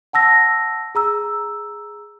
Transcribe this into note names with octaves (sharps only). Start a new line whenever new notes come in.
F#5 A5 E6 A#6
G#4 A#5 E6